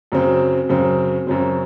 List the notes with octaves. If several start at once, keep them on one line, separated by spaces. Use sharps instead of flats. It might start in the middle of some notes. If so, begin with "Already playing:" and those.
F#2 C#3 F#3 C4
F#2 C#3 F#3 C4
F#2 C#3 F#3 C4